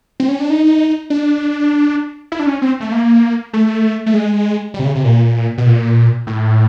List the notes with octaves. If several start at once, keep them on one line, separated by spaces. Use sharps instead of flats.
C4
C#4
D4
D#4
D4
E4
D4
C#4
C4
A3
A#3
A3
A3
G#3
G3
C3
C#3
C3
A#2
B2
A#2
A2